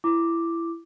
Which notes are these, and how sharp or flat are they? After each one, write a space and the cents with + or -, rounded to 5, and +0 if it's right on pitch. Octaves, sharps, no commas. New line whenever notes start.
E4 +20 D6 +0